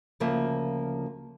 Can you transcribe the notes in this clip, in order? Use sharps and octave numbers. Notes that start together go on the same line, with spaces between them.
D2 C#3 F3 A#3 E5 F5